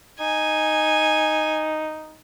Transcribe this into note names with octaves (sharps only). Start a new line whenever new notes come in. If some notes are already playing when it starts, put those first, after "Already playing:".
D#4 G#5